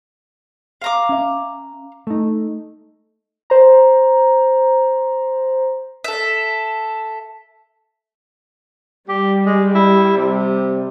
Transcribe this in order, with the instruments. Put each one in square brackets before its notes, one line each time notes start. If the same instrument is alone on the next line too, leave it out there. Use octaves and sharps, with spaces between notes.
[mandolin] F5 A#5 D6
[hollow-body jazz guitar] C#4 E5
A3 D#4
[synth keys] C5 A#5
[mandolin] A4 E5
[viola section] G3 [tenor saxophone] G4
[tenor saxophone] G#3
E4
C3